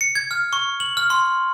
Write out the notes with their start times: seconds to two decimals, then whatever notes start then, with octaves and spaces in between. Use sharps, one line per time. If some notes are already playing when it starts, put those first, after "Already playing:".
0.01 C#7
0.15 G#6
0.31 F6
0.53 C#6
0.80 F#7
0.97 F6
1.10 C6